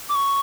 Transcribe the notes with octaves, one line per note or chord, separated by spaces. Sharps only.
D6
C#6